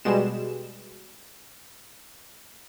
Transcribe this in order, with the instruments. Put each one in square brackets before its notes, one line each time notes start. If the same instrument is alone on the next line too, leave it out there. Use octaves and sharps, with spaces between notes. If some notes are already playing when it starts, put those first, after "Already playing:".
[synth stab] B2 G3 G#3 E7